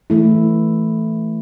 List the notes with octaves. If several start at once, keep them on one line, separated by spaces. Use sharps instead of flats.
E3 A3 E4